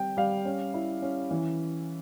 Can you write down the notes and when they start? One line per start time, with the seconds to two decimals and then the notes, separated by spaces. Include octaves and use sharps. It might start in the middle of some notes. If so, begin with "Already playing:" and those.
Already playing: G3 C4 G5
0.17 G3 F5
0.45 C#4
0.74 E4
1.02 C#4
1.31 E3